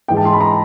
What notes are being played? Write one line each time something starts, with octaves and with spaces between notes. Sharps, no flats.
G#2 E3 G#3 G5
A5
C6
B5
A#5